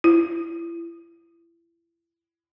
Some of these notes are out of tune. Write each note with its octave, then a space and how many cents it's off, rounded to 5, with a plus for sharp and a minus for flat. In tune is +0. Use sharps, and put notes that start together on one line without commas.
E4 +30